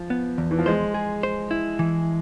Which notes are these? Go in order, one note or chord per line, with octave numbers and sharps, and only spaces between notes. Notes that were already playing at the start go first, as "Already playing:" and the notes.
Already playing: F3
B3
E2
E3
F3
G#3 C5
G#4
C5
E4
E3